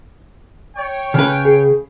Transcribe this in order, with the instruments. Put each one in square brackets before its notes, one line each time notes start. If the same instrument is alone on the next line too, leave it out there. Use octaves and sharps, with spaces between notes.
[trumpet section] C#5 G5
[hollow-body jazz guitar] C#3 B4
[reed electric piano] G#4